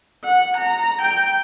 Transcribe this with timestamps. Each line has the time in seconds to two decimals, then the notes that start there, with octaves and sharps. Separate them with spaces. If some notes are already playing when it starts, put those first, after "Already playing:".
0.24 F#5
0.57 A#5
1.02 G5